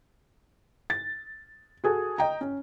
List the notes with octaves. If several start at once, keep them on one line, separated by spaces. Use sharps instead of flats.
A6
F#4 G#4 A4
D#5 G5 A#5
C#4